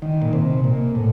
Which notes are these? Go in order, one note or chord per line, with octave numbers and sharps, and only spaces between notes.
D#3
A#2
C3
A#2
A2